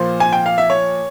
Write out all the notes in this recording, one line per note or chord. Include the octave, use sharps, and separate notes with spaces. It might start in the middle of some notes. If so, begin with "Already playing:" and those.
Already playing: A#2 F3 A#3 C5
G#5
G5
F5
E5
C#5